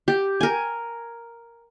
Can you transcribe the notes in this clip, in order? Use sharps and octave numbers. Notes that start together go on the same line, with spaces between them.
G4
A#4 G#5